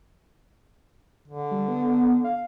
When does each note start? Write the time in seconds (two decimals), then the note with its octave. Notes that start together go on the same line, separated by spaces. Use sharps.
1.28 D3
1.51 G3
1.68 B3
2.24 F5